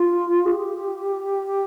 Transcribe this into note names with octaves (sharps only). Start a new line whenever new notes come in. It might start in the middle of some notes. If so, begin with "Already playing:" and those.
Already playing: F4
G#4
G4